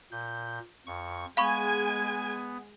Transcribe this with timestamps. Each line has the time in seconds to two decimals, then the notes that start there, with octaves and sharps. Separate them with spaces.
0.12 A#2 G6
0.87 F2 C#6
1.37 G#3 B3 F5 G#5 B5 C#6